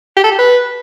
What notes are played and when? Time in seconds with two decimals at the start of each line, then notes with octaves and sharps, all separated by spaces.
0.17 G4
0.24 A4
0.31 G4
0.39 B4